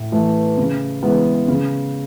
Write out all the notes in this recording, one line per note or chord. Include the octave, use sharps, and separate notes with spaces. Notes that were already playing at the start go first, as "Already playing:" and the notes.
Already playing: A2
E3 A3
C#3
E3 G#3 B3
C#3